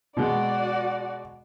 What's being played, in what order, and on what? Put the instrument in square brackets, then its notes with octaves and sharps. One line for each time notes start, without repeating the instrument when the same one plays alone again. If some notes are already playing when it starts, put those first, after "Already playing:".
[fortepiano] B2 G#3 [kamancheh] F#4 D5